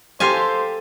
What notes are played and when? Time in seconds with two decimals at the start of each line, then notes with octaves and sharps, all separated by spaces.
0.20 G4 A4 C5 F5 G#5 C6